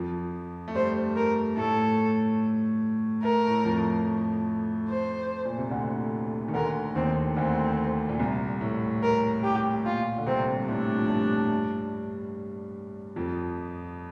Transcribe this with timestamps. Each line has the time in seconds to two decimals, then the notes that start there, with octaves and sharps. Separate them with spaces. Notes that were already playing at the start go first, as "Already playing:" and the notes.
Already playing: F2 F3
0.68 A3
0.75 G2 G3 C5
1.16 A#4
1.57 A2 A3 A4
3.23 A3 A#4
3.47 A2 A3
3.65 F2 F3
4.89 C5
5.45 A#2
5.58 C3
5.71 D2 D3
6.48 D#3
6.54 D2 D3 A#4
6.95 D#2 D#3 C4
7.37 D2 D3 C4
8.09 A#2
8.19 C2 C3
8.61 A2
9.03 A#4
9.44 G4
9.85 A#2 F4
10.18 D3
10.26 C2 C3 C4
10.56 G3
10.68 A2 A3 D4
10.98 F3
11.09 G2 G3
13.16 F2 F3